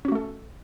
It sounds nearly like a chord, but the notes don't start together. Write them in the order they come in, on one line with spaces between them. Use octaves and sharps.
C#4 F#4 A3 A4